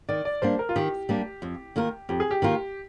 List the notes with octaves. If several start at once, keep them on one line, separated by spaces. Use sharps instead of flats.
D#3 D5
D5
G3 A#3 D4 C5
A#4
F4
D#3 G4
G3 A#3 D4
F2
D#3 A#3 F4 A#4
F2 G4
G#4
G4
D#3 A#3 F4 A#4